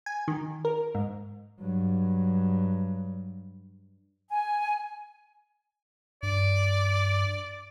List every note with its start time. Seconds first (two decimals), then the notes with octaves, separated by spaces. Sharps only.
0.06 G#5
0.28 D#3
0.65 A#4
0.95 G#2
1.60 G2 F#3
4.29 G#5
6.23 G2 D5